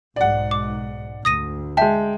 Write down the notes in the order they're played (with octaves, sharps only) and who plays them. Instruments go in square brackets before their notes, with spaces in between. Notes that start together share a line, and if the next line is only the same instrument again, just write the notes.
[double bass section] B1 G#2 [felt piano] D5 F#5
[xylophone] D6
[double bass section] D2 [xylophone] D#6 A#6 D#7
[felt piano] G#3 G5 [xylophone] E5 A5